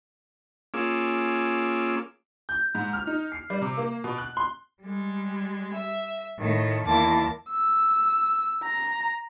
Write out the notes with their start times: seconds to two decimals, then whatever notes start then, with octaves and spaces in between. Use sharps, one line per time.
0.74 A#3 C#4 F4 G#4 D6 E6
2.49 G6
2.75 G#2
2.93 F6
3.07 D#4
3.32 C7
3.50 G3
3.62 C3
3.77 A#3
4.04 B2
4.18 F#6
4.37 C6
4.81 G3 G#3
5.74 E5
6.38 A2 D#3 A3
6.86 E2 D#3 A#3 E4 A5 D6
7.50 E6
8.63 A#5